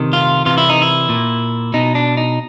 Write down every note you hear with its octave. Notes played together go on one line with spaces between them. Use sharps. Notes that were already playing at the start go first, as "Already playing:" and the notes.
Already playing: C3 D#3
F4
C3 E3 F4
E4
D#4
E4
A#2
B2 D#4
D4
D#4